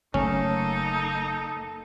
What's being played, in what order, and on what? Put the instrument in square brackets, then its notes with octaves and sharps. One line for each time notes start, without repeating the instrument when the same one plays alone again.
[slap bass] F#1 A3 [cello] A#3 A4 [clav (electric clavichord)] C#4 [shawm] D#4